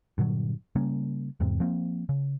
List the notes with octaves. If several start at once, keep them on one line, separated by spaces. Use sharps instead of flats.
G2 A#2 D3 F#3
C#3 G3 A#3 C#4
E2 G#2 C3
F3 A#3 C4
C#3